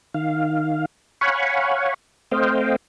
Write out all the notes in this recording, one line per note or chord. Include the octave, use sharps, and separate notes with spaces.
D#3 F5
C#5 F5 F#5 G#5 B5 C#6
A3 C4 C5 D#5 F5 G5